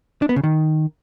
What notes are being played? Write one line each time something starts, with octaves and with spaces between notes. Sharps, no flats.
D4
B3
C#3
D#3